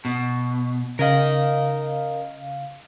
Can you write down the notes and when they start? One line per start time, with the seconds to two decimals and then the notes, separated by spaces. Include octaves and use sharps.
0.05 B2
0.99 C#3 A#4 D#5 F5